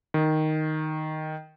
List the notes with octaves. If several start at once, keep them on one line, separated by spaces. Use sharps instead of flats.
D#3